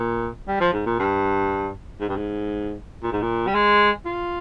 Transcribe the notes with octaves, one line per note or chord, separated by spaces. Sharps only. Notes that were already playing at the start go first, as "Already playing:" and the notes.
Already playing: A#2
G3
F3
G#2
A#2
G2
G#2
G2
G#2
A#2
G#2
A#2
G3
G#3
F4